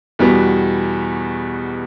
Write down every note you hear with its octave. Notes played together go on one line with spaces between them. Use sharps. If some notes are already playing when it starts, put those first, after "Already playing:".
E2 B2 G3 B3 F#4